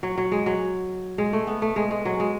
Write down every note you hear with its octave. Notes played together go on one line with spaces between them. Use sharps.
F#3
F#3
G#3
F#3
G#3
A3
B3
A3
G#3
G#3
F#3
G#3